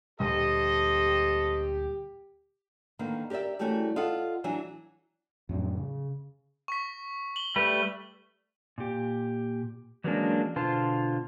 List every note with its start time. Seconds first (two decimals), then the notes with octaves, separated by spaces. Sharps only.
0.20 D2 A#2 G3 G4 A4 C5 D#5
2.99 D3 D#3 A#3 B3
3.30 G4 A#4 B4 D5 E5
3.59 E3 G3 A3 C#4 F#4 A#4
3.96 F4 A4 D#5 F5 F#5
4.44 E3 F#3 D4 E5 G#5
5.49 F2 A2 F#3
5.77 C#3
6.68 C#6 B6
7.36 F#7 G7
7.56 G3 A3 B4
8.78 A#2 G4
10.04 E3 F#3 G#3 A#3 C#4 D4
10.56 B2 D3 F4 C5 A5